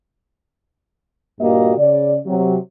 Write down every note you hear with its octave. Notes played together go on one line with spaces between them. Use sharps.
G2 A#2 A#3 F#4 G4 D#5
C#3 D5
C3 F#3